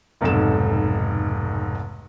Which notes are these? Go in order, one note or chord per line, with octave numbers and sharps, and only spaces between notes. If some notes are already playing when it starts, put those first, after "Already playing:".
F1 B1 G#2 A4 E7